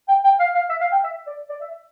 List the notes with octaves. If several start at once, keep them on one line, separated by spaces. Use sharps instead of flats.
G5
G5
F5
F5
E5
F5
G5
E5
D5
D5
E5